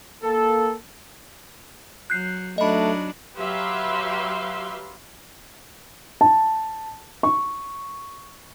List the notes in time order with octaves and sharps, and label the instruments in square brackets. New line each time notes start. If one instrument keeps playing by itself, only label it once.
[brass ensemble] A#3 A4
[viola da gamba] F#3 [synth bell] F#6 G6 C7
[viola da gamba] F#3 D4 D#4 [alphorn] A3 [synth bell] D#5 B5
[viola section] F#3 G4 B4 E5 F5 C6
[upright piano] A5
C#6